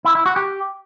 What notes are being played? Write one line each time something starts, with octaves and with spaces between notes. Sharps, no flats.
E4
E4
F#4
G4